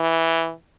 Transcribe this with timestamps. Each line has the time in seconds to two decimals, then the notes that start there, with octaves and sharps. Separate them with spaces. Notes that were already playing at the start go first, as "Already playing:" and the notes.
Already playing: E3